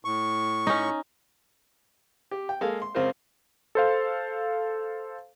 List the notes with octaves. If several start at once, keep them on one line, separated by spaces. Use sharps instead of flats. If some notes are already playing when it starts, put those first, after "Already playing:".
A2 C#6
C#4 D#4
G4
G5
G#3 A#3 A4 F5
C6
C#2 C4 F4 A#4 C5
A4 C5 F5